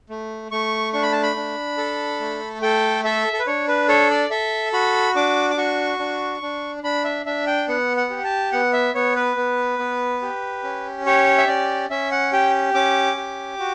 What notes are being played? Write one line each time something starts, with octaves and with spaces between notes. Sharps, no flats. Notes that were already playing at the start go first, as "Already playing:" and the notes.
A3
A3 C#6
D4 C#6
B5
A5
B5
D4
A4
A3
A4 G5
A4 E5
A4
B4
D4 C#5
B4
A4 C#5
D5
A4 E5
F#4 B5
D4 D6
D6
F#4 C#6
D4
D4
D4 B5
E5
D4 E5
G5
B3 F#5
F#5
G4
A5
B3 F#5
E5
B3 C#5
B4
B3
B3
G4
C#4
G4 C#5
E5
C#4 D5
C#4 E5
F#5
G4 G5
C#4 D6
G4
F#4